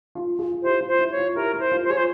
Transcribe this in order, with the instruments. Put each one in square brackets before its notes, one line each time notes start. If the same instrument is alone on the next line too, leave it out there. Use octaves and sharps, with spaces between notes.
[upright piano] F4
F4 G#4
F4
[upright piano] E4 G4 [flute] C5
[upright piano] F4
[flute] C5
[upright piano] E4
[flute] C#5
[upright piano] F4
[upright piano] E4 G4 [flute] A#4
[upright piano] E4
[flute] C5
[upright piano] F4
[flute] C5
[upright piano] F4 G#4 [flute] C#5
[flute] C5